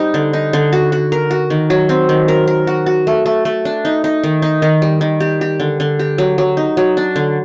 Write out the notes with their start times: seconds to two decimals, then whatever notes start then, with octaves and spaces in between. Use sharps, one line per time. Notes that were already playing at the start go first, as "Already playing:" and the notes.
Already playing: G3 C4 D#4 G4
0.14 D3
0.33 D#4
0.53 D3
0.73 F#4
0.92 F#4
1.12 A#4
1.31 F#4
1.50 D#3
1.70 F#3
1.89 C4
2.09 D#3
2.28 A#4
2.47 A#4
2.67 F#4
2.86 F#4
3.07 A3
3.26 A3
3.45 A3
3.65 D4
3.85 D#4
4.04 D#4
4.23 D#3
4.42 D#4
4.62 D#3
4.82 G3
5.01 D#3
5.20 G4
5.41 G4
5.60 D3
5.80 D3
5.99 G4
6.18 F#3
6.38 F#3
6.57 D#4
6.77 F#3
6.97 D4
7.16 D3